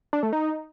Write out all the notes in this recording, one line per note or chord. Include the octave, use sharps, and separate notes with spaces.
D4
A3
D#4